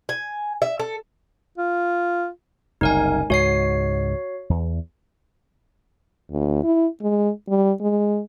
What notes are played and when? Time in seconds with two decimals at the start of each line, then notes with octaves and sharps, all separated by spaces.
0.09 G#5
0.62 E5
0.79 A4
1.58 F4
2.81 F#1 C2 D#4 A#4 G#5
3.30 C#2 G#2 G#3 F#4 C#5 C7
4.50 E2
6.31 D2
6.64 E4
7.02 G#3
7.49 G3
7.81 G#3